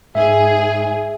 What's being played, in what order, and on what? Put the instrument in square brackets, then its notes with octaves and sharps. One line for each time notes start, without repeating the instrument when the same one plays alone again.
[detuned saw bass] G#2 [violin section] G#4 [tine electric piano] E5